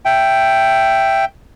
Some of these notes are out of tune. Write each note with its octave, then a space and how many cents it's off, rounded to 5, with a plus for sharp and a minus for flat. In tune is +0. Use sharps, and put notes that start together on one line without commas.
E5 +10 G5 +0